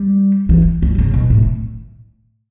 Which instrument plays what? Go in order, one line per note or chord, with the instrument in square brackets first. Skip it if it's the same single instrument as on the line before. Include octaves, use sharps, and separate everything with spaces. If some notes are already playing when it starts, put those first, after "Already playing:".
Already playing: [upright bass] G3
E3
G3
C#3
B2
A2